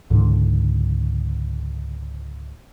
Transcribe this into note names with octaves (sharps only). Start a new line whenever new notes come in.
C#2 G#2 D3 E3